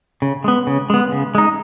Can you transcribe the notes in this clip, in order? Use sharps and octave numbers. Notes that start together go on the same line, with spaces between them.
C#3
G#3 B3
C#3
G#3 B3
C#3
G#3 D#4